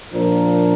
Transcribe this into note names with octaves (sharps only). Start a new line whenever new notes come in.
A#2 F3 D4 A#4